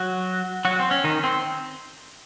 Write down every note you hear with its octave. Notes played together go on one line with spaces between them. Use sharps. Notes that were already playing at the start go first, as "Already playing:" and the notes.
Already playing: F#3 F#4
F#3 F#4
C4
C#4
D#3 D#4
C4